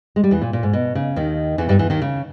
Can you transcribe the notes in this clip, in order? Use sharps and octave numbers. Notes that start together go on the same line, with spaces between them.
G#3
G3
E2 E3
A#2
A#2
G#2
B2
C#3
D#2 D#3
E2 E3
G2 G3
E2 E3
D#2 D#3
C#3